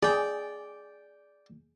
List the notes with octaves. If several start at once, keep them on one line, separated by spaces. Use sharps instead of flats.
G#4 D5 G5